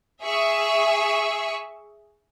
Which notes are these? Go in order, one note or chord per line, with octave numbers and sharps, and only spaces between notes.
G#4 E5 C#6